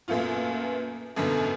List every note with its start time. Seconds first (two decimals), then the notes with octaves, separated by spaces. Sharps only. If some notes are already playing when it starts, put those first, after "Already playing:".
0.08 F#2 A#2 A3 B3 F4
1.16 G#1 F#2 B2 D3